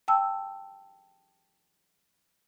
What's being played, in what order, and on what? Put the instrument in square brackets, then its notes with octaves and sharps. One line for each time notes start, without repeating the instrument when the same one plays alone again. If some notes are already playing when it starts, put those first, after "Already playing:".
[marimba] G5 A5 E6